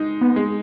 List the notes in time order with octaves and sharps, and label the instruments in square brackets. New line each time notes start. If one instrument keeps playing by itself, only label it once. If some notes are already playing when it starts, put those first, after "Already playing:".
Already playing: [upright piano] G#3 D#4
[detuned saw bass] B3
[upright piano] G#3